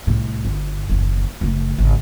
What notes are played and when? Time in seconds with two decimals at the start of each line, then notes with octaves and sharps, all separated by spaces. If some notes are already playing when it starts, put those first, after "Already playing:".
0.07 C2 A2
0.45 G1
0.90 F#1 D#2
1.41 F#1 A3
1.78 G#1 C#3